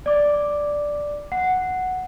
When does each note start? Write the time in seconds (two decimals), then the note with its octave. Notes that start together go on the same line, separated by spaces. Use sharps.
0.06 D5 D6
1.32 F#5